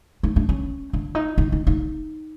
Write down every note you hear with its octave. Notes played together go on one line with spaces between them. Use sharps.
D#4
D4
C#4
D4
D#4
D#4
D#4
D#4